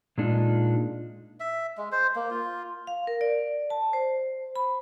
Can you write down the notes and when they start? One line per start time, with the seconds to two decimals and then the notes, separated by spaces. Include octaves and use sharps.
0.18 A#2 G#3 D4 D#4 F4
1.40 E5
1.77 G#3
1.92 C5
2.15 A#3
2.30 F4
2.87 F5
3.07 A#4
3.21 D5
3.70 A5
3.93 C5
4.56 B5